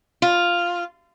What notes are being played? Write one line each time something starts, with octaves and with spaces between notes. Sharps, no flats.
F4